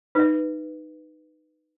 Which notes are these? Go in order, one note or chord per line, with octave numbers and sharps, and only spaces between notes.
D#4 B4 E5